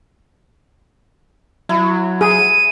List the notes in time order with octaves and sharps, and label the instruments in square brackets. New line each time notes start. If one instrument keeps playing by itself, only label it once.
[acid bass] F#3 [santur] E4
[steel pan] G#4 [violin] D#7